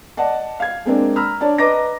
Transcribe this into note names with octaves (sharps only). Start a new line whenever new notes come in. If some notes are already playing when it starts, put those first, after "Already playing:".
D5 D#5 F#5 A5
F5 G#6
G#3 A#3 C4 D4
A#5 B5 E6 F6
D4 C#5 D5 A5
B4 D#5 A#5 D6 A#6